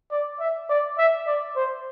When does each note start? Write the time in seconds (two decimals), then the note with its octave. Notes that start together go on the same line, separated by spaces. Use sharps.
0.12 D5
0.40 E5
0.69 D5
0.98 E5
1.27 D5
1.56 C5